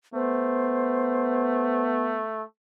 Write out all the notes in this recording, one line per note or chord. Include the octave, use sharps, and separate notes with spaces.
A3 B3 C5